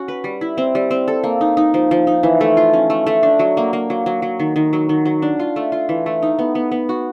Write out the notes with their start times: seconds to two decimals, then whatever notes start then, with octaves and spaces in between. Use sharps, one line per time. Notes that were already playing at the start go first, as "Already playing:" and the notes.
Already playing: C#4 F#4
0.08 B4
0.24 G3
0.41 E4
0.58 C4
0.75 G3
0.91 C4
1.08 A4
1.24 A#3
1.41 D#4
1.57 D#4
1.74 F3
1.91 F3
2.07 D#4
2.23 E3
2.41 A3
2.57 F4
2.73 C#4
2.90 A3
3.07 A3
3.23 D4
3.39 F#3
3.57 A#3
3.73 A#3
3.90 F#3
4.06 F#3
4.22 F#3
4.40 D#3
4.56 D#3
4.73 F#3
4.89 D#3
5.05 F#3
5.22 D4
5.40 F4
5.56 A3
5.72 F4
5.89 E3
6.06 A3
6.22 D#4
6.39 B3
6.55 B3
6.72 B3
6.89 F#4